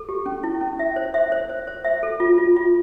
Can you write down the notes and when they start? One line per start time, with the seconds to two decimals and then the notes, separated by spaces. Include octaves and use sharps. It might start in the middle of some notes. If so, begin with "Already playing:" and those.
Already playing: A4
0.09 G4
0.26 C#4
0.43 E4
0.61 C#4
0.79 E5
0.96 C5
1.14 E5
1.32 C5
1.49 C5
1.67 C5
1.85 E5
2.03 A4
2.20 F4
2.38 F4
2.56 F4